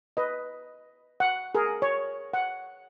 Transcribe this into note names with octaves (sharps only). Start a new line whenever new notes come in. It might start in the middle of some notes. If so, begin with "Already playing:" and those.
B4 D#5
F#5
G#4 A#4
C#5
F#5